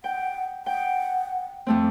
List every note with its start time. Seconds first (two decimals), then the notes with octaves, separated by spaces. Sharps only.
0.04 F#5 G5
0.66 F#5 G5
1.67 F2 A3 C4